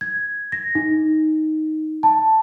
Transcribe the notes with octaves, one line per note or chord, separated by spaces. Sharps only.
G#6
A#6
D#4
A5